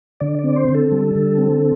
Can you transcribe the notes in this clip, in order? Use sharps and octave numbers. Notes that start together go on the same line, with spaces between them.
D3 D5
D5
C4
C5
D3
A4
G3
D3
C4